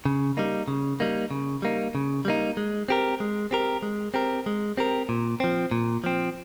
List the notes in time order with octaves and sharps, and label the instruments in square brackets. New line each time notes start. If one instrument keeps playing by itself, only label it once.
[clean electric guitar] C#3
G3 A#3 D#4
C#3
G3 A#3 D#4
C#3
G3 A#3 D#4
C#3
G3 A#3 D#4
G#3
C4 G4 A#4
G#3
C4 G4 A#4
G#3
C4 G4 A#4
G#3
C4 G4 A#4
A#2
F3 C4
A#2
F3 C4